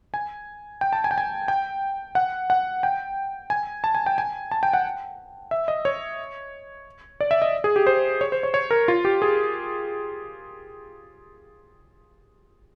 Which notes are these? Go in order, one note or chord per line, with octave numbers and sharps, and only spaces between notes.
G#5
G5
A5
G#5
G5
G#5
G5
F#5
F#5
G5
G#5
A5
G#5
G5
G#5
A5
G5
F#5
E5
D#5
C#5
D5
E5
D#5
G#4
G4
C5
C#5
C5
C#5
C#5
A#4
F4
G4
G#4